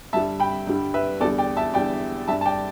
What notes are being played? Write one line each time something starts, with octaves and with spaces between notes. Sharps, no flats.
G2 D3 G3 E5 A5
G5 B5
G2 D3 G3
B4 E5
E2 D3 G3 A4 D5
D5 G5
E5 A5
E2 D3 G3 D5 G5
G2 G3 E5 A5
A5
D5 G5